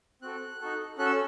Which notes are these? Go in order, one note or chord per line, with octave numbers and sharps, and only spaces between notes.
C4 F#4 A4 F#6
D#4 F#4 A4
C#4 F#4 A4 F#6
E6